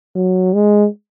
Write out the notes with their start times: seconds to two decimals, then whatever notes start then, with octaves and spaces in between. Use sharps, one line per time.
0.16 F#3
0.54 G#3